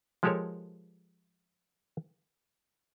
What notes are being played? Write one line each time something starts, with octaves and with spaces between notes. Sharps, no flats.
F3 G#3 G4 A4 A#4 C#5